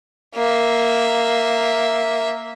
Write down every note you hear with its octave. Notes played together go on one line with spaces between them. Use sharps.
A#3 E5